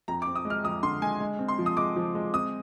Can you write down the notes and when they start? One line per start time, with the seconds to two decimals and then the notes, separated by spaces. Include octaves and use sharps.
0.08 F2 A#5
0.22 D6
0.27 C4
0.35 D#6
0.45 G#3
0.50 F6
0.64 F2 D#6
0.83 D3 C6
1.02 G#3 G#5
1.20 G#3
1.39 C4
1.48 C6
1.58 F3
1.66 D#6
1.77 G#3 D6
1.96 F3
2.15 G#3
2.33 C4 D#6